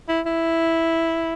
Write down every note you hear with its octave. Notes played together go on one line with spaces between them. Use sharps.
E4
E4